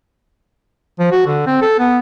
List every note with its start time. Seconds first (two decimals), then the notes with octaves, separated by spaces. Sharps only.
0.99 F3
1.11 F#4
1.27 D3
1.46 C4
1.61 A4
1.79 B3